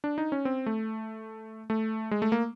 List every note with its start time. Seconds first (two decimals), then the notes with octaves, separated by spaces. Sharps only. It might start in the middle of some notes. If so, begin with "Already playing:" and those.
0.04 D4
0.18 D#4
0.32 C#4
0.45 C4
0.66 A3
1.70 A3
2.11 G#3
2.22 A3
2.32 A#3